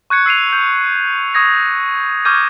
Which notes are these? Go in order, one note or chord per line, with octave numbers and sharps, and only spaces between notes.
C#6 F#6 G#6 C#7
E6 C7 D#7 F7
G6
C#6 D#6 G#6 A#6
C#6 D6 F6 G6 G#6 D#7